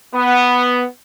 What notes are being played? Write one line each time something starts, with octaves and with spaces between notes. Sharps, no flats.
B3